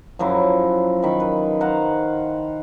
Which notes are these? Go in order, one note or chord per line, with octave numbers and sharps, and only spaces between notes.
F#2 F3 F#3 E4
D#3 B5
B4
C5 F5 F#5 A#5